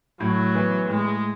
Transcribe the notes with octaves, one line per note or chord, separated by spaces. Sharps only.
A2 F#3
E3 B3
A2 G#3